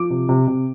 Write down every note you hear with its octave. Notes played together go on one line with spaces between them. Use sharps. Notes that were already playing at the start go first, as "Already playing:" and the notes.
Already playing: F3 D6
C3
C3
C3